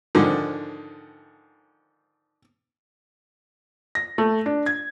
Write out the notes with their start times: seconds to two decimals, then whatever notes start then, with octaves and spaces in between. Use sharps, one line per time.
0.15 G#2 D3 D#3 F3
3.95 A#6
4.18 A3
4.46 D4
4.66 G#6